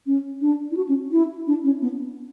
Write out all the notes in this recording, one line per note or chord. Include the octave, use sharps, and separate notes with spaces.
C#4
D4
E4
F#4
C#4
E4
D4
C#4
B3